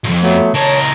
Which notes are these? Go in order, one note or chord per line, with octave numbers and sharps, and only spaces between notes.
B1 F2
F#3 A3 B3
C#2 A#4 C#5 A5